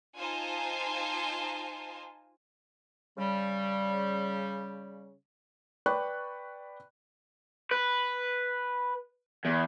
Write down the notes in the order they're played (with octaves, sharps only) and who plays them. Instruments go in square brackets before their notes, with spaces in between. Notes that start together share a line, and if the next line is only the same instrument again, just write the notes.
[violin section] D#4 F4 C5 G#5 A5
[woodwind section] C#3 G3
[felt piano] B4 D5 G5 B5 C#6 F#6
[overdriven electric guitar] B4
E2